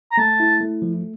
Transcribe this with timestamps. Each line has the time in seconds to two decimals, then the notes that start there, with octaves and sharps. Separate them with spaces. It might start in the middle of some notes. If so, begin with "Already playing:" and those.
0.12 A#5
0.18 A3 A5
0.40 E4
0.61 A3
0.82 F3